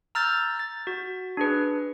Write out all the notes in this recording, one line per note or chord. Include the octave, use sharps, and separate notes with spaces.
A#5 E6 F6 G6 A6
A6
F#4
D4 G#4 B4